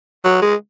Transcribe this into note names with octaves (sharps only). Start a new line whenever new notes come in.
F#3
G#3